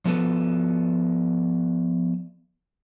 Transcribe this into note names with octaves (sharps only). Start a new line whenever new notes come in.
F3 B3 A4 B4